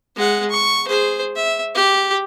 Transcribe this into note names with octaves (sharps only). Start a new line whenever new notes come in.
G#3 F#5
C#6
G#4 C5
E5
G4